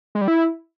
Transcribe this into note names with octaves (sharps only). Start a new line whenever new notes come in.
G#3
G3
E4